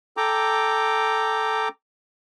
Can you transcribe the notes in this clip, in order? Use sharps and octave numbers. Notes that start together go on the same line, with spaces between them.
A4 G5 A#5 D6